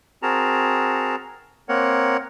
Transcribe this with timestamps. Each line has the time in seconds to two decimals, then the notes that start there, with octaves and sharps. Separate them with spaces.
0.22 C4 F#4 G#4 A#4 A5 A#5
1.69 A#3 C4 A#4 C#5 F#5